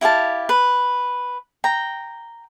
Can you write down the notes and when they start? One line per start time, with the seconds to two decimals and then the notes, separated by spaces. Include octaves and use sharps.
0.01 E4 G4 F5 A5
0.49 B4
1.64 G5 A#5